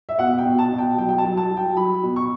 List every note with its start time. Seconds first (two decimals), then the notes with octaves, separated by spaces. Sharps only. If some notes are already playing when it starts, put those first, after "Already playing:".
0.09 E5
0.19 B2 F#5
0.38 G5
0.46 B2
0.59 A5
0.72 B2
0.78 G5
0.98 F#3 G5
1.09 G5
1.18 A5
1.25 F#3
1.37 A5
1.51 F#3
1.57 G5
1.77 F#3 B5
2.03 B2
2.16 C#6